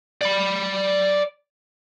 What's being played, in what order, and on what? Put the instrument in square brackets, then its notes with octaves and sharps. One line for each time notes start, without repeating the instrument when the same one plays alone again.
[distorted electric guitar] D5 B5